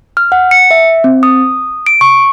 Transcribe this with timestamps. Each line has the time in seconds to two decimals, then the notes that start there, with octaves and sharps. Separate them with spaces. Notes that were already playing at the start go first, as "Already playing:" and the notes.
0.17 F6
0.32 F#5
0.51 C#7
0.71 E5
1.04 C4
1.23 D#6
1.86 D7
2.01 C#6